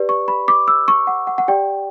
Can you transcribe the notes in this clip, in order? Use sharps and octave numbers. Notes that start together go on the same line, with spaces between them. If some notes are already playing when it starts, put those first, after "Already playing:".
Already playing: G4 B4 D5
C#6
B5
D6
E6
C#6
F#5
F#5
F#5
G4 D5 G5